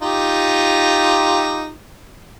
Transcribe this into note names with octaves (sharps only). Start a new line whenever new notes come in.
D#4 F4 G4